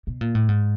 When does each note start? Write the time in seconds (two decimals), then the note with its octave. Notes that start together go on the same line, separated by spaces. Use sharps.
0.07 B2
0.21 A#2
0.35 A2
0.48 G#2